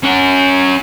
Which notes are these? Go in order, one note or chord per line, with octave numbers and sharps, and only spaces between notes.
C#4 F#5